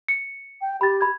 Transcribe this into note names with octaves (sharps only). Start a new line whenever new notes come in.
C#7
G5
G4 B5 A6
B5 G#6